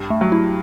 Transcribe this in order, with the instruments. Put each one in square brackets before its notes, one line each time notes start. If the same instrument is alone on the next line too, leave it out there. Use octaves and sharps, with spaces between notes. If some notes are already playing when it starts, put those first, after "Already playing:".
Already playing: [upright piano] G2
[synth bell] A3
[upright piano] F#3
[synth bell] E4